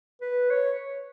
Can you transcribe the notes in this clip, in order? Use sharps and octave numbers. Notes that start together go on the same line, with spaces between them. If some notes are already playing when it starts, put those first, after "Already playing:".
B4
C#5